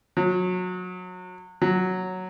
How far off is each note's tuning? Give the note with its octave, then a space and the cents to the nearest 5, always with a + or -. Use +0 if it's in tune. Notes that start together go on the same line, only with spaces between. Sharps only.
F#3 -25
F#3 +0